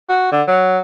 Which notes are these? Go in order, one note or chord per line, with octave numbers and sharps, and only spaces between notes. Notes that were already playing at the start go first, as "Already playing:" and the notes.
F#4
D3
F#3